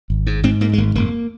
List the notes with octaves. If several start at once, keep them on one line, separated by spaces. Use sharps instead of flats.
G#1
G#2
G#2 C4
G#2 A#3
G#3
G#1 A#3
F1 A#3